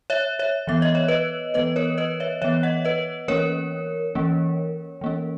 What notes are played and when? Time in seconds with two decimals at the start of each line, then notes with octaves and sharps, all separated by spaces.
0.10 C#5 E5
0.39 C#5 E5
0.67 E3 B3 E5
0.82 D#5
0.95 C#5
1.08 B4 D#5
1.54 E3 B3 B4 D#5
1.76 A#4 C#5
1.98 B4 D#5
2.20 C#5 E5
2.42 E3 B3 C#5 E5
2.63 D#5 F#5
2.85 B4 D#5
3.28 E3 A#3 C#4 A#4 C#5
4.15 E3 A#3 C#4
5.01 E3 A#3 C#4